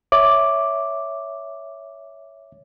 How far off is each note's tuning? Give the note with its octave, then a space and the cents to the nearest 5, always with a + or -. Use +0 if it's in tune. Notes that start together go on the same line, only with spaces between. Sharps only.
C#5 +10 E5 +0 D6 +0